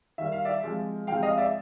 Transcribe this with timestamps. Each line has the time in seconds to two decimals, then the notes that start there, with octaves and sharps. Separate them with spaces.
0.18 D#3 G3 A#3 E5
0.32 F5
0.45 D5 E5
0.63 C3 F3 G#3
1.07 C3 F3 G#3 F5 G5
1.23 D#5 F5
1.38 D5 E5